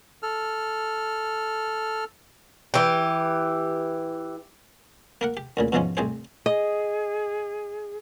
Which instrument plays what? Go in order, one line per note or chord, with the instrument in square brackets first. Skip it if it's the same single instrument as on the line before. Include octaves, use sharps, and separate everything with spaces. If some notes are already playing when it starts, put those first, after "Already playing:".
[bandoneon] A4 F6
[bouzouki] E3 G4
[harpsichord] A#3 A#4 F#5
G4
D2 A#2 C#3
E2 G#2 B2 F3 G#3 C#4
C2 A2 G4 G#4 C5
[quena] G#4 [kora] D#5